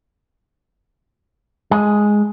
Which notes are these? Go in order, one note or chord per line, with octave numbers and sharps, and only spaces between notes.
G#3